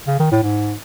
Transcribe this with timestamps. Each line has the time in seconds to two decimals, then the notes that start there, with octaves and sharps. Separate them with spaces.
0.07 C#3
0.19 D#3
0.31 A2
0.43 G#2